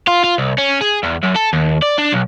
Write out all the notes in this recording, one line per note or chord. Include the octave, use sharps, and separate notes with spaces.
F4
F4
C2
C#4
G#4
E2
F#2
A4
D#2
D5
D4
B1